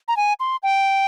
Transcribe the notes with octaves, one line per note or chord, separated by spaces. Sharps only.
A#5
G#5
C6
G5